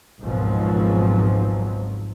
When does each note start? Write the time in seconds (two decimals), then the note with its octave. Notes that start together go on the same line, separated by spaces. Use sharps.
0.20 G#1 C#2 G#2 B2 F3 F#3